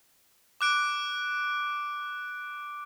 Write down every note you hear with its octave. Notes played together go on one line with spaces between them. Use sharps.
D6 F#6 D7